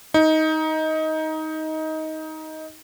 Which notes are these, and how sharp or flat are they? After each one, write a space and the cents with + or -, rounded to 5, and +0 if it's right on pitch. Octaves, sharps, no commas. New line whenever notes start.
D#4 +15